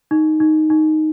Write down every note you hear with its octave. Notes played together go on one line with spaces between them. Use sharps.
D#4
D#4
D#4